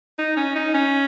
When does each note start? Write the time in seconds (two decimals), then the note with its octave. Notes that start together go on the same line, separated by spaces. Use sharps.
0.19 D#4
0.37 C#4
0.55 D#4
0.74 C#4